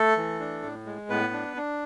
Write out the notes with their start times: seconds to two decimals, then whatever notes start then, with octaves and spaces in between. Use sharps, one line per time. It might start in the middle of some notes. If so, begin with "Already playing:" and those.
Already playing: A3 A4
0.17 E3
0.40 D4
0.63 A2
0.86 G#3
1.09 A2 B3 B4
1.33 D4
1.56 D4